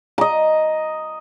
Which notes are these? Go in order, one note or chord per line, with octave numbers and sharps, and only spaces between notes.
D#5 A#5